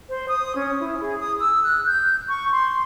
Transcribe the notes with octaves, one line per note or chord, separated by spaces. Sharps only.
C5
D#6
C#4
E4
G#4
D#6
E6
F#6
G6
C#6
C6